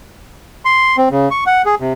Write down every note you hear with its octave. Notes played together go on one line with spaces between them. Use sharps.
C6
C4
C#3
C#6
F#5
G#4
C3